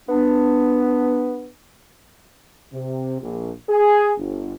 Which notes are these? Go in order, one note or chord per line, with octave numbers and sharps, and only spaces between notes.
B3 D4
C3
A#1
G#4
G1